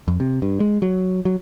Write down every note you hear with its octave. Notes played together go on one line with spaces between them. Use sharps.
F2
C3
G2
G#3
F#3
F#3